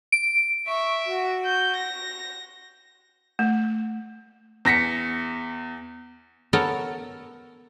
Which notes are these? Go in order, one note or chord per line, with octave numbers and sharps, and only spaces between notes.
D7
E5 C#6
F#4
G6
A#6
A3
E2 A#6 B6 C#7
B3 A4 A#4 C#5